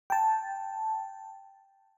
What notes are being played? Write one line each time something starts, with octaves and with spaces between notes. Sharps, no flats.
G5 A5